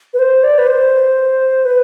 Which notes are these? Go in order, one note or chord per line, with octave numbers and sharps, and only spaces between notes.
B4
C5
D5
B4
C5
B4